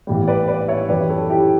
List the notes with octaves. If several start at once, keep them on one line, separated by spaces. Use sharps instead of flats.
A1 A2 E3 G3
B4 D5
B4 D5
C#5 E5
F#2 E3 G3 B4 D5
A4 C#5
E4 G4